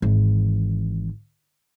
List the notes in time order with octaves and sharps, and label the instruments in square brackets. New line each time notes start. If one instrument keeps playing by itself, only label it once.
[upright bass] G#1 E3